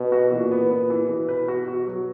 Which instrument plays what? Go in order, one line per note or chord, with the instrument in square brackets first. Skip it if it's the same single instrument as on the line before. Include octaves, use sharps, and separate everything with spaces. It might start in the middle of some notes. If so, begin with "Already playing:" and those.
Already playing: [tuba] B2
[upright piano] F#4
[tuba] A#2 [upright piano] E3
[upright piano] B3
[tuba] A#2 [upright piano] B3
[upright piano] E3
[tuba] B2 [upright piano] E3
[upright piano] B4
F#4
F#4
F#3